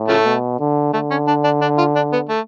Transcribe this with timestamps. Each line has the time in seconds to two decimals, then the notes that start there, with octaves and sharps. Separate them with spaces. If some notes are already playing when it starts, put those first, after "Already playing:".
Already playing: A2
0.08 C#3 F3 A3
0.26 B2
0.59 D3
0.93 D3 A3
1.11 C#4
1.27 D4
1.44 D4
1.61 D4
1.78 F4
1.96 D4
2.13 B3
2.29 A3